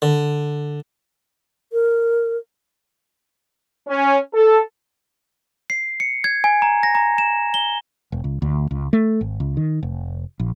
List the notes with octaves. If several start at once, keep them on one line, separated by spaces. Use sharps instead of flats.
D3
A#4
C#4
A4
C7
C#7
G#6
G#5
A#5
A#6
A#5
E7
G7
E1
C#2
D2
C#2
A3
G#1
C#2
D#3
F1
A#1